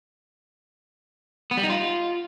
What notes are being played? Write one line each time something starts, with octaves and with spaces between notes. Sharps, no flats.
B3
G3
D#4
F4